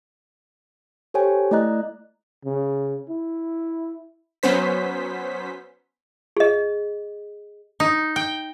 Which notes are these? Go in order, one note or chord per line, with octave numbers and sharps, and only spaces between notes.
G4 A4 C5 C#5 G5 G#5
A3 E4 D5 D#5 A#5 F#6
C#3
E4
F#3 B3 C#4 C5 B6
G#4 D#5
D#4
G5